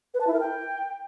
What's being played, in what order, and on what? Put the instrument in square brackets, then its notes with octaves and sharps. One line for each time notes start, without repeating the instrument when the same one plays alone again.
[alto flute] B4
A5
E4
A#4
G5